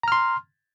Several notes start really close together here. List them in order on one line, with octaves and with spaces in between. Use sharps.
A#5 F6 C6